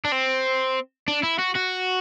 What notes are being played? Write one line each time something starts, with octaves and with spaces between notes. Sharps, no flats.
D4
C4
D4
E4
F#4
F#4